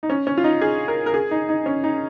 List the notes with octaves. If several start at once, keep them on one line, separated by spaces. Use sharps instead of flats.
D#4
C#4
C#4
F4
D#4
G#4
A#4
A#4
G#4
D#4
D#4
C#4
D#4